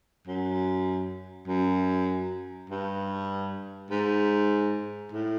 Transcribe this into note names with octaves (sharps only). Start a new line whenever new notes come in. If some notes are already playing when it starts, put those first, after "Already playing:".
F#2
F#2
G2
G#2
A2